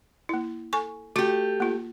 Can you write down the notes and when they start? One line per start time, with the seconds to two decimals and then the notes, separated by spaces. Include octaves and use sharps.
0.29 A#3 E4
0.73 A4 G#5 C#6
1.16 A3 F#4 G4
1.60 A#3 F4